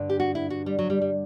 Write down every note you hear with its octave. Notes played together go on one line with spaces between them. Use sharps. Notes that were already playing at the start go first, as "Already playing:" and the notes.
Already playing: G2 D3
G4
F#4
E4
F#4
G3
F#3
G3
G3